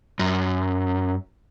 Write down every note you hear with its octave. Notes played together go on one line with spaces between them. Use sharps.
F#2